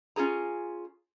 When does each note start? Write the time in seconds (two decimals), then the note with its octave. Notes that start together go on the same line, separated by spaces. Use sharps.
0.16 C#4 F4 G#4 A#5